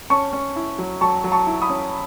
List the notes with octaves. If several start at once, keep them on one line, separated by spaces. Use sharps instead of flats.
C#4 A5 C#6
C#4
E4
F#3
F#3 A5 C#6
F#3
A5 C#6
E4
B5 D#6
C#4